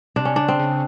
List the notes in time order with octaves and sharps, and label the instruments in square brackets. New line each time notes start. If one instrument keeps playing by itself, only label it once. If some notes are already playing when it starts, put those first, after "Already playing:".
[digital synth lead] C3 [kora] D4
[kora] C#4
[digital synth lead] C#3 [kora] D4
[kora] C4
[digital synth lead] C#3